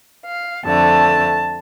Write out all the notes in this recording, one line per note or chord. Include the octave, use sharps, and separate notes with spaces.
F5
F2 D3 A3 A5